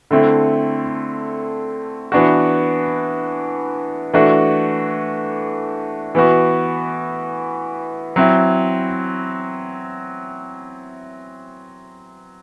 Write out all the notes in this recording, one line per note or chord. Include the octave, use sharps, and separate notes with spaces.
D3 A3 C4 E4
E3 B3 D4 F#4
E3 A3 D4 F#4
E3 B3 F#4
F#3 C4 E4